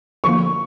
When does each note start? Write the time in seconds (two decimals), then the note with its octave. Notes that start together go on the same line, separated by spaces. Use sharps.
0.24 D3 F3 A#3 C#6